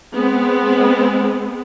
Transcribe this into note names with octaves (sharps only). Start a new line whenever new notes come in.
G#3 B3 C4